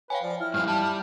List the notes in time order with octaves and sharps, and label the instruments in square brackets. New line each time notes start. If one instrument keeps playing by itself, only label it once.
[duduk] B4 [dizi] C#5 [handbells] F5 G5 G#5
[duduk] F3 [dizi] D5
[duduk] E4 [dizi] F6
[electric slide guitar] G2 F3 [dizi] F6
[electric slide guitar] G3 [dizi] A5